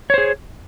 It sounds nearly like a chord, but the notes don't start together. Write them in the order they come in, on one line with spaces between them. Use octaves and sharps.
C#5 C5 G#4